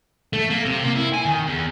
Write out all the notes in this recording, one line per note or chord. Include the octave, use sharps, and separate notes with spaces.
A3
A#3
C3
A#3
E4
G#5
D#3
E2